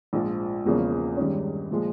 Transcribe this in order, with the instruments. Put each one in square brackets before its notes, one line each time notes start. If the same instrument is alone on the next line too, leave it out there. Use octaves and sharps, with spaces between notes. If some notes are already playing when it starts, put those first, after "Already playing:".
[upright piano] A#1 G#2 F3
E1 E2 C#3 F3 A#3
G2 D#3 G#3 C#4
A#2 F3 G#3